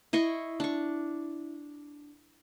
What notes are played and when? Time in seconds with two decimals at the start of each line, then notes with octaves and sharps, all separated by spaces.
0.13 E4 D#5 C6 C#6
0.60 D4 C#6